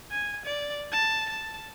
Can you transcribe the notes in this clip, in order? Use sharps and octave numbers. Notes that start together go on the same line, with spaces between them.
G#5
D5
A5
A5